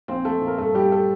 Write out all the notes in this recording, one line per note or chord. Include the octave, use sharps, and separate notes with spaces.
A#1 C4 C5
A#1 A3 A4
A#2
A#4
G2 A3 A4
G2 G3 G4
A3 A4